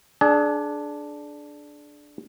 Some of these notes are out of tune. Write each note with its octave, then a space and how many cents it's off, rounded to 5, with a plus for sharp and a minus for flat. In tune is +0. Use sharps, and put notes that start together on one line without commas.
D4 +0 G#4 +35